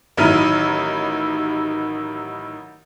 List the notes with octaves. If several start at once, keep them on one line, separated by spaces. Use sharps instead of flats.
A1 D#3 F#3 E4 F6 D#7